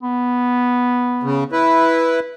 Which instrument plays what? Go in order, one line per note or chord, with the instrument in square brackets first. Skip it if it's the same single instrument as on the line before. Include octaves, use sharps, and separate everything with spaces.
[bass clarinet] B3
[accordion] C#3
E4 B4